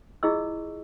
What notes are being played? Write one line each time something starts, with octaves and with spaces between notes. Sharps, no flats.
E4 F4 G#4 D#5 C#6 E6